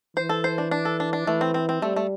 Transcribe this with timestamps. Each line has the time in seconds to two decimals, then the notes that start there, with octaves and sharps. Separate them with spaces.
0.17 E3 C5
0.29 A4
0.44 C5
0.58 D4
0.71 D4
0.85 A4
1.00 D4
1.13 D4
1.27 E3 A3
1.41 C4
1.54 C4
1.69 C4
1.82 G3 A3
1.96 A3